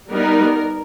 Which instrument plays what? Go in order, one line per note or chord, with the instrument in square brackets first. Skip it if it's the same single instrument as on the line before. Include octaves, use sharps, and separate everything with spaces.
[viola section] G3 B3 D#4 A#4